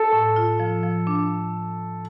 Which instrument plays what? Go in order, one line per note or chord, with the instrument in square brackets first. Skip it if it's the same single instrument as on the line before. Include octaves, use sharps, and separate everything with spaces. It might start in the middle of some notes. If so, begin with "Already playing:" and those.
Already playing: [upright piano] A4
[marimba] A2
F4
F3
F3
D4